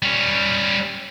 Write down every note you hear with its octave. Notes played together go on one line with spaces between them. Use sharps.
G3 C#4